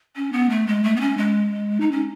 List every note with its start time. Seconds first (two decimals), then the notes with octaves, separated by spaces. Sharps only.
0.16 C#4
0.32 B3
0.49 A3
0.67 G#3
0.83 A3
0.96 B3
1.00 C#4
1.17 G#3
1.80 D#4
1.91 C#4